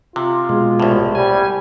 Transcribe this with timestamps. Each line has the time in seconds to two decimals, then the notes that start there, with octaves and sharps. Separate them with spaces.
0.16 C3 F4
0.49 B2 G#3
0.80 C2 A2
1.15 G3 G#5